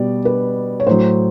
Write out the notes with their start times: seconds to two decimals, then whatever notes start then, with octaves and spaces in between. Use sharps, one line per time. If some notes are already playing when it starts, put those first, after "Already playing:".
Already playing: B2 G3 D5
0.25 B4
0.80 C#5
0.87 A2 F#3 C5